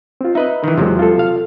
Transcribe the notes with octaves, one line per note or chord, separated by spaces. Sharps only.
C4 F4
D#4 B4 D#5 E5
D#3 E3
E2 C3 F3 F#3 G#3
F4 A4
F5